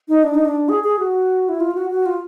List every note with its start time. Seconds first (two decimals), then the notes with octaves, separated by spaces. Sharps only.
0.09 D#4
0.23 D4
0.34 D#4
0.45 D4
0.69 G#4
0.84 G#4
0.99 F#4
1.49 E4
1.60 F4
1.75 F#4
1.90 F#4
2.06 F4